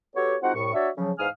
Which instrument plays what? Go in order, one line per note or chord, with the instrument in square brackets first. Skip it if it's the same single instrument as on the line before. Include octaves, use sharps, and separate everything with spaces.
[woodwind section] B3 F#4 G4 A4 C#5
G#3 C4 D#4 F4 F#4 F#5
C2 A2 C#6
D4 F#4 C#5 D5 E5
C#3 F3 F#3
E2 G#2 F5 G#5 D#6 F6